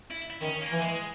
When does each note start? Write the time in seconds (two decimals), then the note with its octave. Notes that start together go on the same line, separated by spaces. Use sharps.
0.11 E4
0.30 E4
0.41 D#3 C#4
0.61 A#3
0.72 E3
0.81 G#3